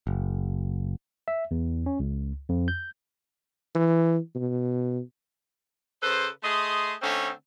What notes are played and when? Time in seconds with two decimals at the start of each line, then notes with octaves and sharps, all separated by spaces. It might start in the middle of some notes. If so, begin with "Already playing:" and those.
0.07 F#1
1.28 E5
1.51 E2
1.86 C#4
1.99 C#2
2.49 F2
2.68 G6
3.75 E3
4.35 B2
6.02 C#3 A4 B4 C5
6.43 A3 G#4 D#5 C6
7.02 D3 A3 C4 C#4 D#4